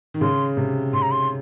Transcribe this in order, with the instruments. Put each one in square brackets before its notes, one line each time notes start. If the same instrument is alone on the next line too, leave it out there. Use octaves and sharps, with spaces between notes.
[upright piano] D#3
[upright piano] C#3 [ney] C6
[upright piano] C3
[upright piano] C#3 [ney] C6
[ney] A#5
C6